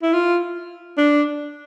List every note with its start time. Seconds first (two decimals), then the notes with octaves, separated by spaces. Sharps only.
0.02 E4
0.13 F4
0.97 D4